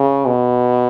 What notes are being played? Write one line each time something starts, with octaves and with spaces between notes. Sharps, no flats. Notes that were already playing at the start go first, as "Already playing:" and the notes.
Already playing: C#3
B2